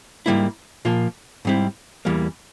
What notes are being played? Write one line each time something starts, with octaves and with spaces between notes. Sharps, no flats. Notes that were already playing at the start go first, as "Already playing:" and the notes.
G#2 G3 A#3 E4
A#2 F3 A#3 F4
G#2 G3 C4 E4
E2 E3 G3 A#3